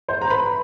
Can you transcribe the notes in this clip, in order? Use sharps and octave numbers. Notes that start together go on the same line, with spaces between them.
C5 C6
A#5
B4 B5